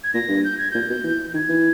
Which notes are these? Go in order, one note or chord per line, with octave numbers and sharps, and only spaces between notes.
G#6
A#2 A#6
G2
G6
G#6
A#2 G6
B2
E3
G6
D#3 G#6
E3